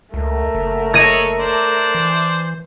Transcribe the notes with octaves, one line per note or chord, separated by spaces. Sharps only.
C#2 A3 A#4
F#1
G#4 A4 C#5 A#6 D#7
D4 C5
E3